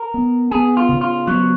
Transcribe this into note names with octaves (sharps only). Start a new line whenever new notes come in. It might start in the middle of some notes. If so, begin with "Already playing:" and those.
Already playing: A#4
B3
B3 G#4
F4
C#3
F4
F#3 B3